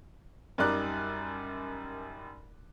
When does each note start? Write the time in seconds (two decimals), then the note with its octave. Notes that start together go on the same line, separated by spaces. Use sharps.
0.58 F#2 G3 D#4 A#4 D5 F#6